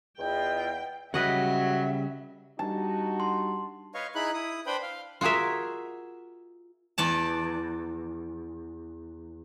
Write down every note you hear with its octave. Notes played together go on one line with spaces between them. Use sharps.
E2 E4 F4 D#5 G5
C#3 F#3 G3 B4 D#5 E5 F#5
G3 D4 D#4 F#4 G4 A5
C6
B4 C#5 D#5 F5 C#6
D#4 E4 G#4 B5 F#6
E4 D#6
D4 B4 C5 G5 B5 G6
F5
F4 F#4 G#4 A#4 E5
E2 D5 A5